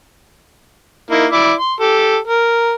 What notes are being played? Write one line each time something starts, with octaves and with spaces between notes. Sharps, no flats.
A#3 D#4 E4
E4 D5 D6
C6
G4 A4
A#4